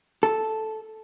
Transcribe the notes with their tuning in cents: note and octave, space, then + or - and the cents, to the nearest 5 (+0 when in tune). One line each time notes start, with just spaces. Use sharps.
A4 -5